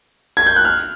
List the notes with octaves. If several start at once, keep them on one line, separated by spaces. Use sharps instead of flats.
G#6
G6
F#6
F6